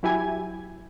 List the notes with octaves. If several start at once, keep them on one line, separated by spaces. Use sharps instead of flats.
F#3 E4 G4 G#5 G#6